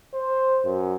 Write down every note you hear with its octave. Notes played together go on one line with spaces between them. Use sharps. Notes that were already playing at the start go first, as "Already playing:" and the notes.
C5
F#2